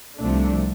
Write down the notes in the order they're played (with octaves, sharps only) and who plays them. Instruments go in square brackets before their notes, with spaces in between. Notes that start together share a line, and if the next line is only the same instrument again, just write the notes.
[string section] C2 C3 F3 A3 D4